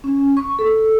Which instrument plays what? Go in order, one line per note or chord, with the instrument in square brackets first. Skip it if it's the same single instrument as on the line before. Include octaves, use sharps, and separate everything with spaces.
[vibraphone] C#4
C#6
A4